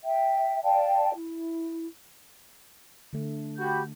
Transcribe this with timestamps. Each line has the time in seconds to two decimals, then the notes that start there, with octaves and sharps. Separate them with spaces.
0.04 E5 G5
0.63 D5 F5 G5 A5
1.15 E4
3.13 D3 A3
3.59 F#4 G4 B5 G6